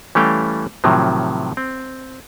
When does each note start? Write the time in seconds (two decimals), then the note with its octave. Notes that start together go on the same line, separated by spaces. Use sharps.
0.15 E3 G3 A3 C#4 F5 G5
0.84 A2 C3 D#3 F3 F#3
1.57 C4